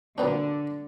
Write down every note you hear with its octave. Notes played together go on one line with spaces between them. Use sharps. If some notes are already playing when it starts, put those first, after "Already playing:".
A#2 D3 F#3 B3 D4